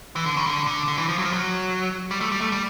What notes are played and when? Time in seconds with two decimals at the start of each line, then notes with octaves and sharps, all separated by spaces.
0.16 E3
0.26 D3
0.37 C#3
0.47 D3
0.67 D3
0.88 D3
0.98 E3
1.09 F3
1.19 F#3
1.25 F3
1.33 F#3
2.11 G3
2.21 A3
2.32 G3
2.41 A3
2.52 G3